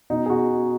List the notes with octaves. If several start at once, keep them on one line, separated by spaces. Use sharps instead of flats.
B2 D#4
G#4
B2 F#4